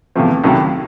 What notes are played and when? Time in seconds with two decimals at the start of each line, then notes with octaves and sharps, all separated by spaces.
0.16 E2 C3 F3 A3 C4
0.44 C#2 C3 D#3 F#3 A3